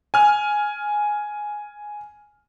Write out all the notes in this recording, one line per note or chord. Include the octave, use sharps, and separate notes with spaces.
G#5 F6